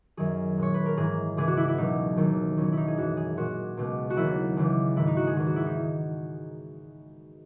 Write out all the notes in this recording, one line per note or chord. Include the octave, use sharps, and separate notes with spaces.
F#2 D#3 F#3 G#4
A#2 G#3 C#5
B4
A#4
G#2 E3 G#3 G#4
C#2 C#3 E3 G#3 G#4
F#4
E4
E4
C#2 B2 F#3 D#4
D#2 D#3 F#3
E2 B2 F#3 C#4
D#4 E4
G#4
F#2 E3 G#3 F#4
G#4
A#2 G#3 F#4
C#2 B2 G#3
F#4
D#2 C#3 F#3 E4
C#2 C#3 E3 G#3
G#2 D#3 G#3 E4
D#4
F#4
G#4
E2 D#3 G#3 F#4
F#4
E4
D#4